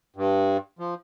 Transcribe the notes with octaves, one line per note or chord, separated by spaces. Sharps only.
G2
F3